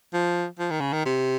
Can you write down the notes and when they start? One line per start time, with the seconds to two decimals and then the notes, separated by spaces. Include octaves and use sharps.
0.14 F3
0.59 F3
0.71 D#3
0.81 C#3
0.93 D#3
1.06 C3